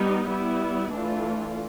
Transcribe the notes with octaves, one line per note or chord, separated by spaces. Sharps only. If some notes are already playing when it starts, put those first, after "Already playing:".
Already playing: G3 B3 D#4 G4
G3 B3 E4
E3 A3 D4 F4